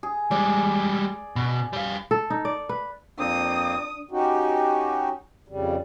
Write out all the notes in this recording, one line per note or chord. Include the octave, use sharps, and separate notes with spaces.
G#4
G3 G#3 D5
B2
G3 F5
A4
D#4
D5
B4
F2 A#3 C4 D4 D5 D#6
C#4 D#4 F#4 G4
F2 C#3 G3